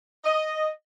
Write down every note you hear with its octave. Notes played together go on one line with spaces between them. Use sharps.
D#5